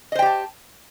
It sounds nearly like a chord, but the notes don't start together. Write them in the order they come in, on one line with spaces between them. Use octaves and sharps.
D#5 C5 G5 G4 A5